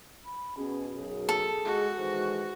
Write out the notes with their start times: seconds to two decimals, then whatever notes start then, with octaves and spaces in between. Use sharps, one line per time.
0.25 B5
0.57 B2 C#4 G#4
0.93 B1 F#2 G#4
1.29 A4
1.65 G#3 F#4
1.98 D#3 E3 G#3 C5